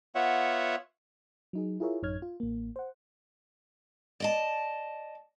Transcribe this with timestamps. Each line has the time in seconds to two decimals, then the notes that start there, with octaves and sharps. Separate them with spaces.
0.15 B3 F4 C#5 E5 F#5
1.53 F#3 D#4 G#4
1.80 E4 F4 G#4 A#4 C#5 E5
2.02 A1 F#2 D#4 C#5 F6 G#6
2.22 F4
2.40 A1 A#3
2.76 C5 F#5
4.20 D5 D#5 A5